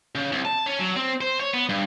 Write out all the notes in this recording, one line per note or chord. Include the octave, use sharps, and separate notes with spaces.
C#3
C2
A5
C#4
F#3
C4
C5
C#5
B3
G2